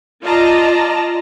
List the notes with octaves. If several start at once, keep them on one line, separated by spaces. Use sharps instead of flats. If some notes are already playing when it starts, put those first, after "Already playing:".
F4 D5 D#5 A5 A#5